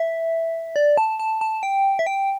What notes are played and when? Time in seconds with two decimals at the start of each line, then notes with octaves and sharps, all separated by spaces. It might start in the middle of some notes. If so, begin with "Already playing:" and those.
Already playing: E5
0.76 D5
0.97 A5
1.19 A5
1.41 A5
1.63 G5
1.99 E5
2.07 G5